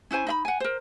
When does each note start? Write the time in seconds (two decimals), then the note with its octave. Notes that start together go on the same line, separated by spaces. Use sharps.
0.11 C#4 E4 C5 G#5
0.27 D#4 E5 B5
0.45 F#5 G#5
0.60 A#4 C5